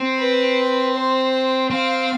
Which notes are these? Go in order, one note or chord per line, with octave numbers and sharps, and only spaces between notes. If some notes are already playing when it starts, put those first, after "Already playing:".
Already playing: C4
B4
C5
C4 F5